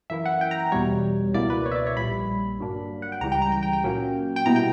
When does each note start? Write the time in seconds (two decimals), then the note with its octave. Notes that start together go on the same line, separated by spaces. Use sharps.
0.10 F#2 E3 A#3 E4 E5
0.25 F#5
0.41 G5
0.51 A#5
0.72 E2 B2 G3 C#5
1.34 C#2 B2 A#3 E4 D5
1.50 B4
1.66 C#5
1.71 E5
1.76 D5
1.87 C#5
1.97 A#1 A#2 G3 B5
2.59 G1 G2 F#3 A#3 D4
3.02 F#5
3.12 G5
3.21 C#2 C#3 E3 G3 A#5
3.32 G5
3.42 A#5
3.52 G5
3.63 G5
3.73 G5
3.84 A#2 F#3 A#3 C#4
4.36 G5
4.46 B2 G3 B3 E4 A#5
4.56 G5